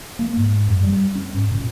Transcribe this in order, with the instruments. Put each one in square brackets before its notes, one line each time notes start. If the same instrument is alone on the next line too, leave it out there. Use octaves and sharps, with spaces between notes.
[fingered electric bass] A#3
G#2
F#2
G3
C#4
G#2
A#2